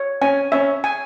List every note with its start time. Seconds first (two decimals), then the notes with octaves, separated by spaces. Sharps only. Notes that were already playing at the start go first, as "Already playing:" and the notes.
Already playing: C#5
0.21 C#4 G#5
0.52 C#4 E5
0.84 G#5